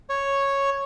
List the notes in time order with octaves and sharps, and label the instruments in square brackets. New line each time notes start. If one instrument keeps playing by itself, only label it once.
[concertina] C#5